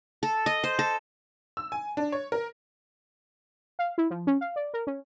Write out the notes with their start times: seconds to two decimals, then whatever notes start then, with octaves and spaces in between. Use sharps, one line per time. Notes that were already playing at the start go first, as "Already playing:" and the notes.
0.23 A4
0.46 D#5
0.64 C5
0.79 A4
1.57 E6
1.72 G#5
1.97 D4
2.12 C#5
2.32 A#4
3.79 F5
3.98 E4
4.10 F3
4.27 C#4
4.41 F5
4.56 D5
4.74 A#4
4.87 C#4